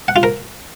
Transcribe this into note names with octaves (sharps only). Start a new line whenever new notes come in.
F#5
F4
A#4